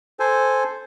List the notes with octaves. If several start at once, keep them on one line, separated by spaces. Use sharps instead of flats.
A4 C5 G#5